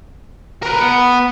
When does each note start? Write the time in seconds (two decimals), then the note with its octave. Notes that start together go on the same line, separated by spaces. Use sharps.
0.63 A#4 B4
0.80 B3